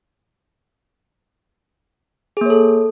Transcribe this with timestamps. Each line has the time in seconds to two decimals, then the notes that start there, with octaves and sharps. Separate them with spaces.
2.37 G#4
2.41 A#3
2.46 C#5
2.50 A4